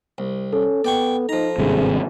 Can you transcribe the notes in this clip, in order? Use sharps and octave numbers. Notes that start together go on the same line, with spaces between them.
C2
C#4 A4
B3 D5 G5 C#6
F3 D#4 A#5
G#1 G2 C3 G#4